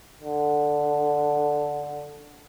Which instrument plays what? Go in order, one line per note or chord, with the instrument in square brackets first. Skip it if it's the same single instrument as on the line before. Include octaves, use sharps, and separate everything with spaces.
[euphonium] D3